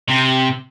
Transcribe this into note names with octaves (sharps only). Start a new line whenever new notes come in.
C3